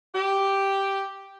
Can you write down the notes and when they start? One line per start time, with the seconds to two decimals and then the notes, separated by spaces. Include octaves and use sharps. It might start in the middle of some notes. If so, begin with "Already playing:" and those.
0.15 G4